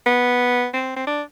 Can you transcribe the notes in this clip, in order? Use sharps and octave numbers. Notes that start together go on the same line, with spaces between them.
B3
C4
C4
D4